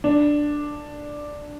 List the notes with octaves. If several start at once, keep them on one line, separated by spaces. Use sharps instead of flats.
D4